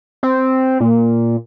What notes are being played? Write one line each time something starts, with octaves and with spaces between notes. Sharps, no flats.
C4
A#2